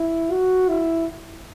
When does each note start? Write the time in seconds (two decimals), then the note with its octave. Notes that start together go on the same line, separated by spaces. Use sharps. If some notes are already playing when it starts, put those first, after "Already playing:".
Already playing: E4
0.31 F#4
0.69 E4